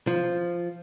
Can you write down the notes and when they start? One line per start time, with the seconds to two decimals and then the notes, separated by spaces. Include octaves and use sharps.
0.07 F3